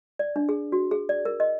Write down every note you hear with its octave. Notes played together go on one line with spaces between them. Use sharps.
D5
D4
G#4
F#4
G#4
D5
A#4
D#5